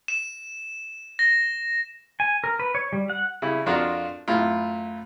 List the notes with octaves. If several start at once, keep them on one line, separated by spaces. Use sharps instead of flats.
E7
A#6
G#5
A#4
B4
C#5
G3
F#5
C#3 G3 E4
F2 D4 F4 F#4 A#4 F#5
F#2 A2 E4 F4